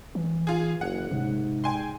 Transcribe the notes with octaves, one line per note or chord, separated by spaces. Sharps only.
E3
F4 G#4
F#1 F#5
G#2 C3
G5 G#5 C6